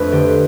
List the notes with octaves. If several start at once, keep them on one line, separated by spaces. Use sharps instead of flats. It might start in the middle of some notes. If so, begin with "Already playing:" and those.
Already playing: F2 A3 D4 B4
D3 G4